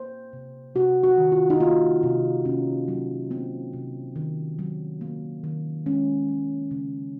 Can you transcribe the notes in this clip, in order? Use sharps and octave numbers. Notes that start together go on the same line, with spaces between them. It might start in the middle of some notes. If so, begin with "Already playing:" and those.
Already playing: A#3 C5
C3
C3 F#4
F#4
D#3
F4
D#4
A#3 F4
C3
C3 C#4
F#3
A#3 C4
C3
D#3
F#3
A#3
D#3
G#3 C#4
G#3
C#3